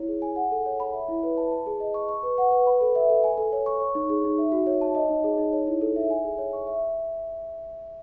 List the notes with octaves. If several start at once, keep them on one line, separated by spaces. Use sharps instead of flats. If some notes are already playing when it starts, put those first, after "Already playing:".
Already playing: E4 C#5
G#4
G#5
F#5
A4
C#5
B5
E5
E4
B4
A5
A5
G#4
D#5
C#6
C#6
B4
F#5
B4
B5
A4
E5
A4
G#5
A4
C#5
C#6
C#5
D#4
G#4
D#4
E5
F#4
C#5
A5
D#5
D#4
G#4
D#4
C#5
E4
A4
E5
G#5
G#4
C#5
C#6
E5